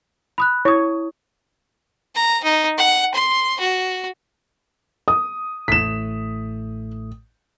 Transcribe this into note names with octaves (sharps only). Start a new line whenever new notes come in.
B5 D#6 F#6
E4 C#5 D#6
A#5
D#4
F#5
C6
F#4
D#6
A1 A2 A3 B6 E7